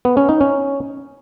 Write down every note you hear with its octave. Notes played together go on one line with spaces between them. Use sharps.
B3
C#4
D#4
C#4